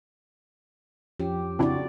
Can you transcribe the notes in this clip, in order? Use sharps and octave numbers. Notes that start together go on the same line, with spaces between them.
F2 F3 C#4 G4
C#3 C4 D4 E4 F#4 D5